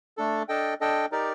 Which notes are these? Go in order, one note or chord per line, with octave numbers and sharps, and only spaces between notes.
A3 D4 A4
D4 A4 D#5 G5
D4 A4 D#5 G5
D#4 G4 A#4 D5